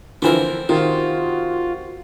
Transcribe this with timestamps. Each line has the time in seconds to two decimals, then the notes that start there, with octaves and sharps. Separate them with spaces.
0.22 D3 E3 F3 B3 C4 A#4
0.69 C3 D#3 F4 F#4